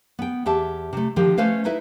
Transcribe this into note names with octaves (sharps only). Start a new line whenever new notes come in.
B3 G5
E2 G4 E5 A5
C3 A3
D3 D#3 F3 G4
A3 C#4 B4 C5 F5
D#4 E4 B4 E5